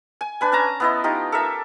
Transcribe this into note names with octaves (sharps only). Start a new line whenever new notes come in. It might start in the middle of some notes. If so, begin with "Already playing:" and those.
G#5
D4 B4 G#5
C#4 A5 A#5
B3 E4 D#5
D#4 F4 G4
A4 A#4 E5